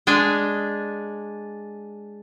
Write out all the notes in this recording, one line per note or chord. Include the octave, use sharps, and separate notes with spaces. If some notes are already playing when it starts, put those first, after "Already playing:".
G#3 D4 G#5